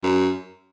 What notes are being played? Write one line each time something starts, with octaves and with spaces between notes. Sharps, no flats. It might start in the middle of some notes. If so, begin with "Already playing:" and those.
F#2